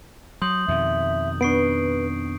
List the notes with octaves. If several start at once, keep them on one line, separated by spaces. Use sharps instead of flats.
F#3 C6 D#6 G6 F#7
F2 B2 D#3 E5
B3 D4 B4 C#6 C7 D7